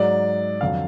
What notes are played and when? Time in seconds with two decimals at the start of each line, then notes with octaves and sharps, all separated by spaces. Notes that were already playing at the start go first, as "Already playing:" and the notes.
Already playing: G#2 F#3 D5
0.61 F2 D3 F#3 F5